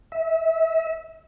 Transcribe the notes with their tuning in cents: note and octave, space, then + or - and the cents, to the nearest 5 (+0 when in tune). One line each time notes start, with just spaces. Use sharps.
E5 -30